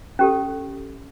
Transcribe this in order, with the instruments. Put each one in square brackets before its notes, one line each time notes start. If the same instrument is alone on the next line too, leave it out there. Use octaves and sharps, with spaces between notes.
[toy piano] C#4 G4 A4